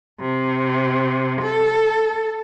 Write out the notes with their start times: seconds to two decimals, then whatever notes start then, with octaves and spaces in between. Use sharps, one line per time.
0.20 C3
1.43 A4